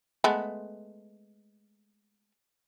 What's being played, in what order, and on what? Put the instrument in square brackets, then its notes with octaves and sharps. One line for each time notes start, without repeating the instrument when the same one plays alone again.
[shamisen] G#3 A3 B3